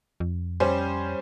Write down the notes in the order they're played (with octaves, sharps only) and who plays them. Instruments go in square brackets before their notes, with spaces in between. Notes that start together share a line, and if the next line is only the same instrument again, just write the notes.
[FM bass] F2
[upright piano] G3 C#4 C5